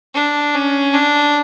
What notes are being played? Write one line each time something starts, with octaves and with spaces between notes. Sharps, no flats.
D4
C#4
D4